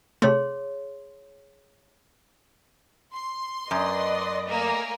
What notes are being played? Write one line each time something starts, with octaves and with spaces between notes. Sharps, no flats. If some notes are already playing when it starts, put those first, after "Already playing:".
C3 A3 G#4 C#5 C6
C6
F#2 B4 D5 D#5
A3 A#3 G#5